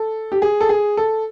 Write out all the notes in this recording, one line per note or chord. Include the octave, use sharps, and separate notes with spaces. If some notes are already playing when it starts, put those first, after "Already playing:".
Already playing: A4
G4
G#4
A4
G#4
A4